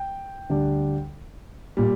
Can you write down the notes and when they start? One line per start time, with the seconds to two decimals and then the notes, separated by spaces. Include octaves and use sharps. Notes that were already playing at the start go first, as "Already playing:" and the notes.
Already playing: G5
0.50 D2 D3 G3 D4
1.77 A#2 G3